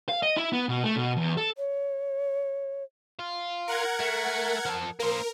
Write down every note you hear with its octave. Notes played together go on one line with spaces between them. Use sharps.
F5
D#5
E4
B3
B2
A3
B2
E2
A4
C#5
F4
A#4 F#5 G#6
A3
F3 A4
A#3 A#4 C5